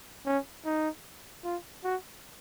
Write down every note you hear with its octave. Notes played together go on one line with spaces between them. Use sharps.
C#4
D#4
F4
F#4